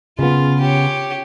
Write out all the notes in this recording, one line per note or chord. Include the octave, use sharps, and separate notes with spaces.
C#3 B3 F4
G4 C#5